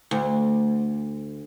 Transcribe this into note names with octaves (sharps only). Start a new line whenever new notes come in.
D2